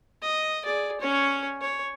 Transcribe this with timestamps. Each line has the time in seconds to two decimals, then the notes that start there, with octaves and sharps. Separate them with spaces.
0.22 D#5
0.64 G#4 D5
1.01 C#4 C#5
1.61 C#5